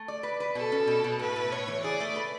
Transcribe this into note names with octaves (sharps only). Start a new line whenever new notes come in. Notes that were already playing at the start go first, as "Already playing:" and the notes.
Already playing: A3
D5
B4
B4
B2 A4
C#4
B2
B2
A2 B4
A2
A2 C#5
E3
G#4 D5
A3
B4